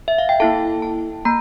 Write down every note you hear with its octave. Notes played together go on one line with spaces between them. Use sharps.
E5
F5
G5
A#3 E4 A4 A5
A5
A#3 A#5